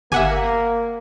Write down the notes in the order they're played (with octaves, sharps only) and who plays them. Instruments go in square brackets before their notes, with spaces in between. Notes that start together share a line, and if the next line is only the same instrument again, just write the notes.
[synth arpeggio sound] G1 G4 [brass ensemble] A#3 [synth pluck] E5 F#5 G#5